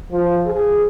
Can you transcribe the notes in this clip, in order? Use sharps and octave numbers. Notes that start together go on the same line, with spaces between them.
F3
G#4